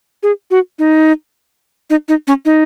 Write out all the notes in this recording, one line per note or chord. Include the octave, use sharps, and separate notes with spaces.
G#4
F#4
D#4
D#4
D#4
C#4
D#4